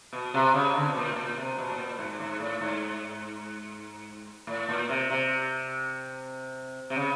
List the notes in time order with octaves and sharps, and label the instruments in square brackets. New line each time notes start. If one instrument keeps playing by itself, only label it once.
[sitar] B2
C3
C#3
D3
B2
A#2
A2
A#2
C3
B2
A2
A#2
G#2
G#2
A2
G#2
A2
A#2
C3
C3
C3
C#3